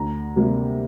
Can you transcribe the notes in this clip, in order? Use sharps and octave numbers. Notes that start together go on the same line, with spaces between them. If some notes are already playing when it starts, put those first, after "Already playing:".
Already playing: D2 A#5
C3 G3 A#3